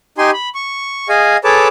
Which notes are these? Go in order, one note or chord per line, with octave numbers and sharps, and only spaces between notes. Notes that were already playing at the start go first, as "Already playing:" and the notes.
D#4 G4 G#5 C6
B5
C#6
G#4 D#5 F5 G#5
G#4 A4 B4 C#5 A5 D6